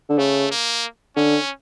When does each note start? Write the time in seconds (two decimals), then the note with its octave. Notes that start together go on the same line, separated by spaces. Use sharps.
0.09 D3
0.18 C#3 A3
0.51 A#3
1.16 D3 C#4